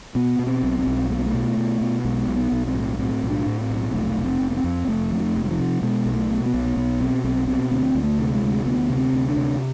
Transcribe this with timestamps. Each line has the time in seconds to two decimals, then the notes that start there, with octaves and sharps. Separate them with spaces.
0.15 B2 B3
0.39 B2
0.47 C4
0.63 B1
0.79 C4
0.86 B1
1.10 B2 A3
1.18 B3
1.26 A3
1.34 B2
1.57 B2
1.81 B2
2.05 B1 G#3
2.28 B1
2.36 B3
2.52 B1
2.67 C4
2.75 A2
2.99 A2 C4
3.22 B1
3.30 D4
3.46 A2
3.61 C4
3.70 B1
3.94 F1 A3
4.17 F1
4.24 C4
4.41 F1
4.51 B3
4.56 C4
4.64 F2
4.88 F1 A3
5.11 F2
5.20 A3
5.35 F1
5.45 G#3
5.51 F3
5.59 C3
5.82 B2 G#3
6.06 B1
6.14 A3
6.30 B2
6.46 B3
6.54 B1
6.76 B1 B3
7.00 B2 C4
7.24 B1 C4
7.48 B2 C4
7.71 D2 C4
7.95 D2
8.03 A3
8.19 C3
8.34 G#3
8.43 D2
8.65 D2 B3
8.90 C3
8.97 C4
9.13 D2
9.29 D4
9.37 C3